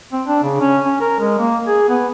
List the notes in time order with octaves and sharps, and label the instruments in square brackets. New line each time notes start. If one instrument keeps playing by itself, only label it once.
[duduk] C4
D4
C#3
C#4
C#4
A#4
G#3
A#3
G#4
B3